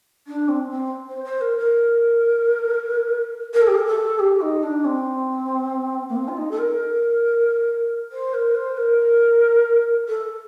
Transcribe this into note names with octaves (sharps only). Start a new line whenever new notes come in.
D4
C4
C4
C5
C5
A#4
A#4
A#4
A4
G4
A4
A4
G4
D#4
D4
C4
A#3
C4
F4
D#4
A4
A#4
C5
A#4
C5
A#4
A4